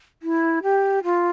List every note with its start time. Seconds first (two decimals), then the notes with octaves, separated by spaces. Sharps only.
0.23 E4
0.63 G4
1.04 F4